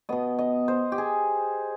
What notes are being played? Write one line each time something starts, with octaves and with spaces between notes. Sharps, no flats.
B2 B3 D#5
D#5
C5
G4
G#4